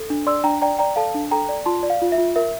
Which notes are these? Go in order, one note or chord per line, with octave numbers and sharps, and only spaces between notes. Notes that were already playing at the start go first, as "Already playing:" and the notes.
Already playing: A4
D4
D5 C6 E6
D4 G5 A#5
D5 G5 A#5
D5 G5 A#5
A4 F5 A5
D4
A4 G5 A#5
D5
F4 A5 C6
D5
F5
F4
E5
F4
A#4 E5